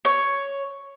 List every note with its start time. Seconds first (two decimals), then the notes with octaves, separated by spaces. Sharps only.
0.05 C#5